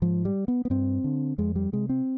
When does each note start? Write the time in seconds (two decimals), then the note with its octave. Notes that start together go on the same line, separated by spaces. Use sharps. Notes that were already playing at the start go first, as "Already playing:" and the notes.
0.02 G#2 F3
0.25 G3
0.48 B3
0.65 B3
0.70 G2 C4
1.04 D3
1.38 F2 G#3
1.56 G3
1.73 C3 G#3
1.89 C4